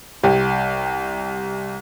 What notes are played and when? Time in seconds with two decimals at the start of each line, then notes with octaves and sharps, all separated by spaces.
0.23 C2 G4